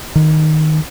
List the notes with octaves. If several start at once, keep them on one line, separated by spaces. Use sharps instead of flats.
D#3